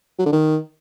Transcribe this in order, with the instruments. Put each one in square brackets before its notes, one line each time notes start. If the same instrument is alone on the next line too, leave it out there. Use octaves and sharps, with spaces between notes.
[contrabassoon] F#3
D3
D#3